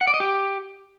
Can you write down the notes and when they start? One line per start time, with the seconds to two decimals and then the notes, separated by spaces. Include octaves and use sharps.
0.01 F#5
0.07 D5
0.14 D#5
0.20 G4